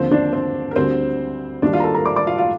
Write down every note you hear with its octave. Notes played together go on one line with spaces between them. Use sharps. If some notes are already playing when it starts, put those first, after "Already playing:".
Already playing: D#2 D3 F3 C4 C5
D4 D5
C4 C5
A#4
D2 D3 G3 C4 C5
D#2 D#3 G3 D4 D5
F4 F5
A#5
A4 A5
A#4 A#5
D5 D6
D5 D6
F4 F5
F4 F5